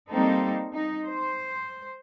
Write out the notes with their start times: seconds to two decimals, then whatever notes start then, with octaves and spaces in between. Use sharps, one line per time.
0.10 G3 A#3 C4 D#4 A4
0.73 D#4
1.05 C5